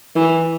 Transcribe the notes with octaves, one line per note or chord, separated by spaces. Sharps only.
E3